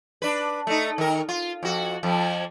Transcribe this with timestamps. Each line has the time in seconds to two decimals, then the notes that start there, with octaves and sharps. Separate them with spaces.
0.22 D4 B4
0.67 A3 D#4
0.98 D#3 A#4
1.29 F4
1.63 F2 F#4
2.03 F2 F3